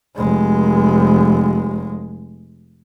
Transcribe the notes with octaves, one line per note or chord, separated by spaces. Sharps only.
F1 G#3